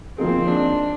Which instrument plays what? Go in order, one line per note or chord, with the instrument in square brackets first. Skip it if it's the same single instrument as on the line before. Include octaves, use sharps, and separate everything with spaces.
[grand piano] F3 A#3 D#4 G#4 [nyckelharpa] C4
[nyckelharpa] D4